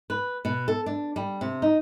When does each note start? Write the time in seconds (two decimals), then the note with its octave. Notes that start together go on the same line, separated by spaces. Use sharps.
0.10 B4
0.45 B2
0.68 A4
0.86 D4
1.16 G3
1.41 C3
1.62 D#4